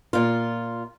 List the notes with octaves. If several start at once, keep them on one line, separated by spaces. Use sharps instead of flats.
A#2 F4